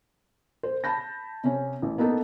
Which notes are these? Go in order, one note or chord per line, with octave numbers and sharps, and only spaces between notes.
C5
A5 B5 G6 A#6
C3 C#4
A1
A#3 B3 D#4 A4